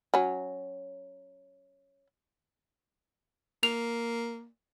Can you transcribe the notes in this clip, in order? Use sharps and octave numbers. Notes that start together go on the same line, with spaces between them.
F#3 C#4
A#3 F7